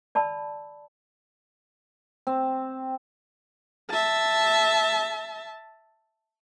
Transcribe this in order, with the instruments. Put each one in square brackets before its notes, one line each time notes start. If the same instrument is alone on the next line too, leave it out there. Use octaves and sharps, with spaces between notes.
[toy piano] D5 A5 B5 E6
[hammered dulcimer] C4
[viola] E5 A5